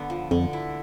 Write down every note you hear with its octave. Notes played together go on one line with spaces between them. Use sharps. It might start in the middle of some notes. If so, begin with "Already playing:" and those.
Already playing: D3 B3
F3
F2 D3
E4